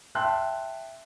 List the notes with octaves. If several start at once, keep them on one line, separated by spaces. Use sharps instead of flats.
E5 G5 A5 C6 F#6